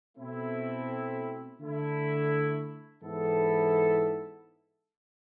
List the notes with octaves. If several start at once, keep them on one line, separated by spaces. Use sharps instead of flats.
B2 A3 C4 E4
D3 A3 E4
G#2 E3 B3 E4 A4